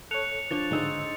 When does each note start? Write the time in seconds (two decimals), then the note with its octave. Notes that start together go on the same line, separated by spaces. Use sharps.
0.11 A4 C#5 F#6 C#7 F7
0.51 F3 D4 C#5 A6
0.71 G#2 D3 D#4 G#4 C5 E6